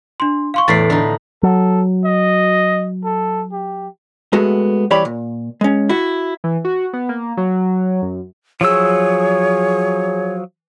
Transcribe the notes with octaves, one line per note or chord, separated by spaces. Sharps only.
D4 C6
F5 C6 C#6
E2 A2 D5 A6 B6 C7
D3 D#4
F#3 A4
D#5
A4
G4
G#3 A3 B3 F#4
C2 E3 G4 C#5 D5 B5
A#2
G#3 C#4
E4 F#4
E3
F#4
B3
A#3
F#3
F#2
F3 F#3 G#4 C#5 E6